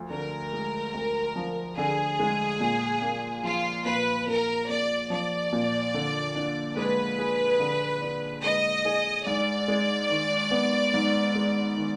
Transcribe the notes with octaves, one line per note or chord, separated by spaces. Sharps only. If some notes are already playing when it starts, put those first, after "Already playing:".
Already playing: D2 F3
D3 A#4
G#3
D2
F3
D3 G#4
G#3
A#2
A#3
F3 F4
A#2 B4
A#2 A#4
A#3 D5
F3 D5
A#2
D3
D4
G#3 B4
G#4
D3
D4
G#3 D#5
G#4
G#2 D5
G#3
D#3
B3
G#2
G#3
D#3